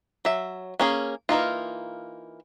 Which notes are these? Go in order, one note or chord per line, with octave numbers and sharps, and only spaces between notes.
F#3 E5
A#3 C#4 G#4
E3 A#3 D#4 F4